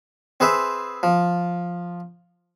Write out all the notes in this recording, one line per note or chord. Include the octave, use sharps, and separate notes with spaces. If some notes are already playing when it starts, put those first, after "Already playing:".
C4 G#4 B4 C5 E5
F3